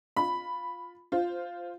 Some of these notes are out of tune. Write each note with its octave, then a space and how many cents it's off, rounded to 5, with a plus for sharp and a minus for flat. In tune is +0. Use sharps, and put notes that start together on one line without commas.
F4 +10 B5 +0
F4 +0 C5 -5